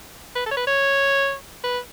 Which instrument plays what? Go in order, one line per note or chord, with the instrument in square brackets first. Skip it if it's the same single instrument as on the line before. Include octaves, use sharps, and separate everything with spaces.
[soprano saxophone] B4
A4
C#5
B4
C#5
B4